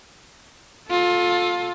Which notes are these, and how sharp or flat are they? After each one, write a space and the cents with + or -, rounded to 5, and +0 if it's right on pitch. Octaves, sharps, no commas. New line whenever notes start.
F4 +25 A4 -5